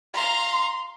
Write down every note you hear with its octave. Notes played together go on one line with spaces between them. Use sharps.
F5 A#5 C6